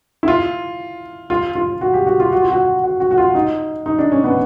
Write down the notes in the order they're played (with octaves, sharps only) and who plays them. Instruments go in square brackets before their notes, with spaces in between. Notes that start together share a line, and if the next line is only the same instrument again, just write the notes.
[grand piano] E4
F4
F4
F4
F#4
G4
F#4
F4
F#4
F4
F#4
F#4
F#4
F#4
F4
D#4
D#4
D4
C#4
B3